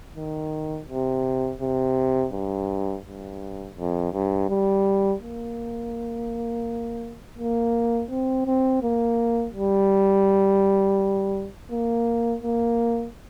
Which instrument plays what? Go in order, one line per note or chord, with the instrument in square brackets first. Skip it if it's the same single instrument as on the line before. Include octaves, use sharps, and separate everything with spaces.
[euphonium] D#3
C3
C3
G2
G2
F2
G2
G3
A#3
A#3
C4
C4
A#3
G3
A#3
A#3